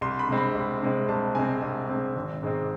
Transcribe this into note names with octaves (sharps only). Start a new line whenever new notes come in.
C2 C6
B5
C3 G#3 C4
B5
C2
C3 G#3 C4
C2 A5
C3 G#3 C4 G#5
C2
C3 G#3 C4
G#1
G#2 G#3 C4